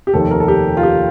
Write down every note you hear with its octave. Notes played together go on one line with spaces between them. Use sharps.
G4
F1 D#2 D#3 A4
A#4
A4
G4
F4
G4